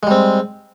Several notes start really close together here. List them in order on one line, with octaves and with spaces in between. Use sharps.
G#3 G3 C4